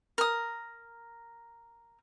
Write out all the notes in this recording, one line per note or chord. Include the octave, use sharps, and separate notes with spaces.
A#4 D#6